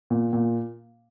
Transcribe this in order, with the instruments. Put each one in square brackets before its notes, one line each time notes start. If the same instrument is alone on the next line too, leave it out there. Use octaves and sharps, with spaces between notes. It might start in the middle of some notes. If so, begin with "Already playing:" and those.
[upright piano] A#2
A#2